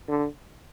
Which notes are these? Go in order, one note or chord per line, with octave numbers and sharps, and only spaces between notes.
D3